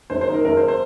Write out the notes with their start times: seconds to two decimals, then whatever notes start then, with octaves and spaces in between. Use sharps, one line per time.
0.10 F#1 C5
0.21 C5
0.28 D#3
0.34 A#4
0.45 F#1 A#4
0.57 C5
0.68 C5